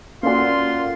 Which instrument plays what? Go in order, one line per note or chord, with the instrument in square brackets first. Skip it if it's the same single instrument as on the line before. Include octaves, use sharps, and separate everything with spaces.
[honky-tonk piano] A#3 F#4 [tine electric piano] C#4 A4 D5 [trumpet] F4 [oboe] C6